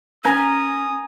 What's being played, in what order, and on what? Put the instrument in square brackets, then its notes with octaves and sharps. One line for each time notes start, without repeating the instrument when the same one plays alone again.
[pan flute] C#4 [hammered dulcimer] G#5 A#5 [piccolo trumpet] D#6